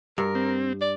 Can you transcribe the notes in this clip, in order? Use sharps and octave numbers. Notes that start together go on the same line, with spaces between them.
G2 A#4
C4
D5